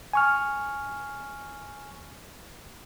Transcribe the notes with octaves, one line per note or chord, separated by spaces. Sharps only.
G#5 C#6 F6